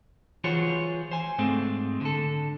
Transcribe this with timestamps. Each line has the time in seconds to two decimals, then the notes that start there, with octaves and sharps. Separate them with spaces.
0.44 E3 F4 F#4 G#4 C5 C#5
1.11 C5 G#5
1.39 G#2 G#3 A3 C4
2.01 D3 A4